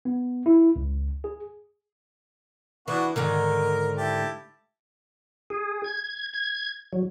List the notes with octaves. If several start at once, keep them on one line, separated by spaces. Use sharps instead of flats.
B3
E4
C#2
G#4
E3 B3 D4 F#4
G#2 D3 D#3 A#4
E4 G4 A5
G#4
G#6
G#6
F#3